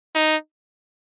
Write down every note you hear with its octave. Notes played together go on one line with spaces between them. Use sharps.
D#4